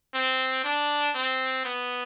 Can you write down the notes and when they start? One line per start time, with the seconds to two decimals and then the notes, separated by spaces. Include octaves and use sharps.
0.14 C4
0.64 D4
1.15 C4
1.65 B3